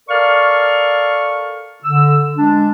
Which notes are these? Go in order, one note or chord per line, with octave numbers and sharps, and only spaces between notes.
A4 A#4 D5 F5 C#6 F6
D3 E6
G#3 D4